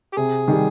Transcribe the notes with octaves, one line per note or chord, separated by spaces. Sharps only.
G4
C3 G#4
D#3 G3